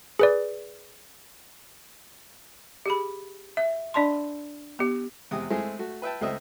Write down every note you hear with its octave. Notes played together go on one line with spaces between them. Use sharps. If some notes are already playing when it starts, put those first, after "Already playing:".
G#4 B4 D5
G4 G#4 B5
E5
D4 D5 A5 C6
B3 G4
E2 C3 G#3 D#6
G#3 A3 C4 E4 G#4
A3 F#4
B4 E5 G5 A5
C#2 A3 C4 D#5 E5